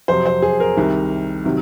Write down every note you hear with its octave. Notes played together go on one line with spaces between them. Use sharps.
F2 C3 F#3 C5
C5
G#4
A#4
C2 C3 D#3
C3 D#3 F#3